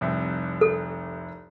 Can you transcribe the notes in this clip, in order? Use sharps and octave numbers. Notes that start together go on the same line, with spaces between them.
F1 C2 E5
A4